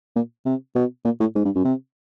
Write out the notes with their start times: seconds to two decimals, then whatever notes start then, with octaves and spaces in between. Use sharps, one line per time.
0.16 A#2
0.45 C3
0.75 B2
1.05 A#2
1.20 A2
1.35 G#2
1.45 G2
1.55 F#2
1.65 C3